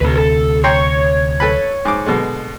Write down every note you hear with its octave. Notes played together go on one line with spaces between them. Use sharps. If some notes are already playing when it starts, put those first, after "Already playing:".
D2 C3 A4 B4
A4
C#5 G5 A#5 C6
A4 B4 B5
G#2 D6
B2 D3 G#3